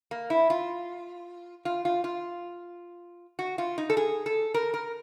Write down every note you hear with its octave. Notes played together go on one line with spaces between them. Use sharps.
A#3
E4
F4
F4
F4
F4
F#4
F4
D#4
A4
G#4
A4
A#4
A#4